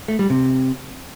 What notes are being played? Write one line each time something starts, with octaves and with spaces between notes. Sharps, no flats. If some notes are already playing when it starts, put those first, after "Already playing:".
A3
G3
C3